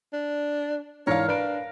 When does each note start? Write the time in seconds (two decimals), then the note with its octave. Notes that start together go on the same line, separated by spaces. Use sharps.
0.13 D4
1.07 G#2 E3 D4 A#4 C#5 F5
1.28 D4 B4 D7